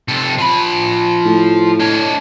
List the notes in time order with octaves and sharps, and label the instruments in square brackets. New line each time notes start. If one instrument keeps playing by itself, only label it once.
[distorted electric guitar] C3 A4
F3 B5
[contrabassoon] A2
[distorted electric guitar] D4 C#5